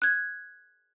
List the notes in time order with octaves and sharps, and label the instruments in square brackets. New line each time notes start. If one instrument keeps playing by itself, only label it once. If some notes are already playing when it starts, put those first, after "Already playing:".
[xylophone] F#6 G#6